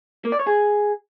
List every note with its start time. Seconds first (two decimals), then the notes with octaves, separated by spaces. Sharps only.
0.25 A#3
0.32 D5
0.39 C#5
0.47 G#4